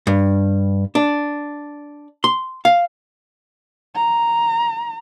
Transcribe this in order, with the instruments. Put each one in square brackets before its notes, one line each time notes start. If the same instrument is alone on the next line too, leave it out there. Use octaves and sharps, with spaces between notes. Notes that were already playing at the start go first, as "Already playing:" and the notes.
[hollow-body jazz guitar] G2
D4
C6
F5
[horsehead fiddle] A#5